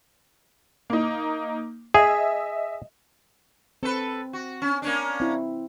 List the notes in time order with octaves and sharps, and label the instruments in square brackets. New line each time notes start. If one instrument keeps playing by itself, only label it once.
[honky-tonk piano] A#3 D#4
[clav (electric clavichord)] G#4 [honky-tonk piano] D#5 E5
[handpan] C4 [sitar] A4 B4
[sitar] F#4
C#4
A#3 C#4 D4
[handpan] C4 E4